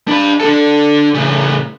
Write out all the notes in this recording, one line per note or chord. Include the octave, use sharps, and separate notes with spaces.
D4 B5
D4 A4
A2 C#3